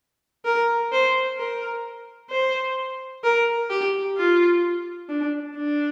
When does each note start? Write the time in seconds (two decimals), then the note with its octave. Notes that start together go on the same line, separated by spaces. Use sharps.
0.45 A#4
0.92 C5
1.38 A#4
2.30 C5
3.24 A#4
3.70 G4
4.17 F4
5.09 D4
5.56 D4